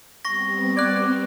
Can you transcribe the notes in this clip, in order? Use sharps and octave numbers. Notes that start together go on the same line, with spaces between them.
G3 B3 C4 C#6 A#6
D5 F#6 G#6